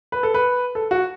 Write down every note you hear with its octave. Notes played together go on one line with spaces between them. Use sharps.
B4
A4
B4
A4
F#4